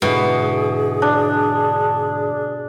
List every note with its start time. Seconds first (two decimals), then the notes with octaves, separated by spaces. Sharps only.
0.02 G#2 B2 D3 E4 G#4
1.02 D4